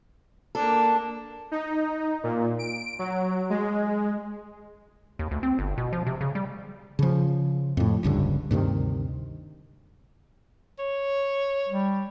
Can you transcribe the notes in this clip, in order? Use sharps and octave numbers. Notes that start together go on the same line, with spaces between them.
A#3 D4 A4
D#4
A#2
D7
F#3
G#3
D#2
D2
C4
G1
B2
F3
C3
C#3
G3
C#3 F3
F2 A2
D#1 C#2 G2 D3
D2 G2 C3 D#3
C#5
G3